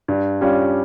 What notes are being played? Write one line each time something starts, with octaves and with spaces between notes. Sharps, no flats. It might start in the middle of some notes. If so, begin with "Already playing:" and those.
G2
G3 C#4 F4